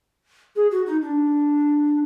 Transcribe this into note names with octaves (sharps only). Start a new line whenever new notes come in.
G#4
F#4
D#4
D4